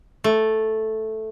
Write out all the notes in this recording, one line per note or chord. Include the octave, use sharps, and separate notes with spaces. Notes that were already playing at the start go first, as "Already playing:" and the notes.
A3